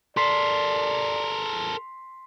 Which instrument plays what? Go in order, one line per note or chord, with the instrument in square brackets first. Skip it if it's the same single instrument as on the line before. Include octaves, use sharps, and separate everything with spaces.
[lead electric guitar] A4 A#4 [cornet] D5 [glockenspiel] C6 B6 C7